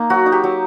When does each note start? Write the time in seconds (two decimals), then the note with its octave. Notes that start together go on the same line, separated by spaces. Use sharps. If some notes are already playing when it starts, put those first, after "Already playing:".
Already playing: A#3 D#4
0.10 F#3 F#4
0.26 D#4
0.32 G4
0.44 F#3